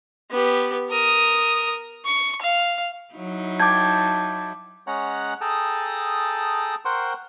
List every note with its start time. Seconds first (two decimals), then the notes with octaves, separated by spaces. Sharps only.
0.31 B3 G4
0.90 A#4 D#6
2.05 C#6
2.42 F5
3.14 F#3 D#4 E4
3.60 G5 A5 D6 G#6
4.87 G#3 C#4 C#5 F#5 A#5 F#6
5.41 G#4 A4 G5 A5 A#5 D#6
6.85 A#4 C5 F#5 G5 C6 C#6